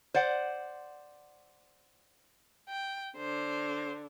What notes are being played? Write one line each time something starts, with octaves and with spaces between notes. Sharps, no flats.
C5 D5 F#5
G5
D3 C5